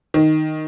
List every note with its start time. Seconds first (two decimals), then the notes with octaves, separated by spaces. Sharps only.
0.14 D#3